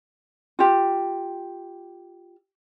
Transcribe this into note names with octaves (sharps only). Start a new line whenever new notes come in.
F4 G4